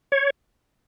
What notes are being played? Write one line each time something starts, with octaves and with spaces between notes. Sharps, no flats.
C#5